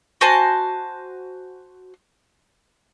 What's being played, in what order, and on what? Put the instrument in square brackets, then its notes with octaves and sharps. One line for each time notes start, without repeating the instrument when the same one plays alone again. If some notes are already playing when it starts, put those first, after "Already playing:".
[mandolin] F#4 C5 G#5 A5